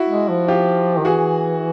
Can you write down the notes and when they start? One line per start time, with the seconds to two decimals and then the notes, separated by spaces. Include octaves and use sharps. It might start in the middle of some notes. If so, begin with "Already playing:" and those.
Already playing: E4 F#4
0.09 G#3
0.29 F3
0.48 F4 G4
0.97 D#3
1.05 E3 F#4 G#4